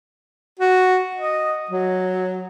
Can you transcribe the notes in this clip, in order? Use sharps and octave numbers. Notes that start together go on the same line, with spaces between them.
F#4
D#5
F#3